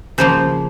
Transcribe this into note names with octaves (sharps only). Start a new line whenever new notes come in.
C#3 F3 A#3 C5